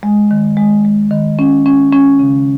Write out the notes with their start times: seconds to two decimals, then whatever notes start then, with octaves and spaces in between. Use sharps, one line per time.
0.03 G#3
0.31 D#3
0.57 G#3
0.85 G#3
1.11 D#3
1.39 C#4
1.66 C#4
1.92 C#4
2.19 C#3